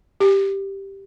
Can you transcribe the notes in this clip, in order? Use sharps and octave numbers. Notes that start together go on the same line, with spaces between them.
G4